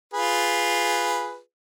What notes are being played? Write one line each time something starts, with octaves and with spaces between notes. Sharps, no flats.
F4 G#4 B4